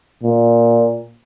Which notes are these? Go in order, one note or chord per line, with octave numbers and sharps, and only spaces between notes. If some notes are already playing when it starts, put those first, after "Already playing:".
A#2